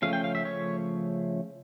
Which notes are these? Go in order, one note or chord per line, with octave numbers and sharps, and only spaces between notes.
C#3 F3 A3 C#4 F5
G5
F5
E5
C#5